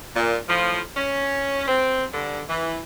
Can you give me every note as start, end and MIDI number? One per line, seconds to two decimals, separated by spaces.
0.15 0.36 46
0.49 0.80 45
0.49 0.80 53
0.95 1.63 61
1.68 2.05 60
2.12 2.40 43
2.12 2.40 50
2.49 2.80 52